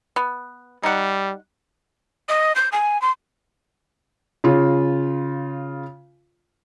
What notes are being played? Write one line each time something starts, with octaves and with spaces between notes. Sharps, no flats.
B3
G3 D#4 F#5
D#5
G6
G#5
C6
C#3 F4